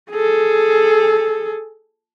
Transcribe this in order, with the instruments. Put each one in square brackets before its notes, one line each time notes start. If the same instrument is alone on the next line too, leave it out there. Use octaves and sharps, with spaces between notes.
[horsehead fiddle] G#4 A4